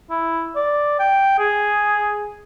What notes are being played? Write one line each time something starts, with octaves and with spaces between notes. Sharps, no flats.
E4
D5
G5
G#4